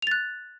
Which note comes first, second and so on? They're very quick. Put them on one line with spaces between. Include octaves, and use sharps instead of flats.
F7 A6 F#6